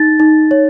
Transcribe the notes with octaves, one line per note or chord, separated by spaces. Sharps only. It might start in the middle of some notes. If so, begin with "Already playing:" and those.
Already playing: D#4 A6
D#4
C#5